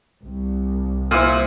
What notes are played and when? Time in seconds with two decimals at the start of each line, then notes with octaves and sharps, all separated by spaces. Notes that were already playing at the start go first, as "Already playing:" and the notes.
0.22 C2
1.11 A#2 E4 C5 D#5